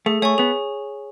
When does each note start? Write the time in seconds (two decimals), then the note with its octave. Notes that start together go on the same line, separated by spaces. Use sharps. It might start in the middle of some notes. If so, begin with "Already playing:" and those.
0.06 A3 G#4
0.22 A3 C#5 G#5 C#6
0.38 B3 G#4